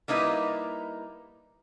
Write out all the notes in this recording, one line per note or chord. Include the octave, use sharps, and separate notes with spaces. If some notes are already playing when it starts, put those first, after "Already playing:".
G3 A#3 D#4 E4 B4